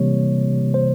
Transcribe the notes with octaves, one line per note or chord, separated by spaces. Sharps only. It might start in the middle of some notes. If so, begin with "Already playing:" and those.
Already playing: C3 E3 G3 A#3 C#5
C5